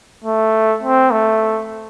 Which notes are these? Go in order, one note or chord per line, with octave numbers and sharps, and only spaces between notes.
A3
C4
A3